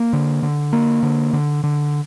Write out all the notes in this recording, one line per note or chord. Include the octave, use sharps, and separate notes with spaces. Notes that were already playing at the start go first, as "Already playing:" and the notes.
Already playing: A#3
D3
D3
A#3
D3
D3
D3